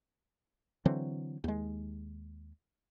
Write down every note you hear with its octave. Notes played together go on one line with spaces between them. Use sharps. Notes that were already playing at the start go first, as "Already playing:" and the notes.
D3 E3 F#3 C4
D#2 G#3